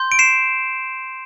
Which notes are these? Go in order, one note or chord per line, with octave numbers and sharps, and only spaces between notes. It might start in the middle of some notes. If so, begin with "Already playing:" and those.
Already playing: C6 G6
D7
C7 E7